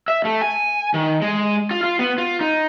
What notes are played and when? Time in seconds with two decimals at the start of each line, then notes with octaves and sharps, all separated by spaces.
0.08 E5
0.25 A3
0.42 G#5
0.94 D#3
1.22 G#3
1.71 F4
1.84 F4
1.99 B3
2.18 F4
2.41 D#4